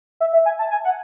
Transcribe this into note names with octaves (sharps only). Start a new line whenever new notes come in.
E5
E5
G#5
A5
G#5
F#5